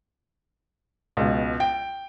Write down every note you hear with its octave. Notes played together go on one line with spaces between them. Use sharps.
C#2 B2
G5